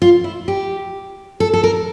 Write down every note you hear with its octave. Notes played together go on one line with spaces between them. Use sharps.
F4
E4
G4
A4
A4
A#4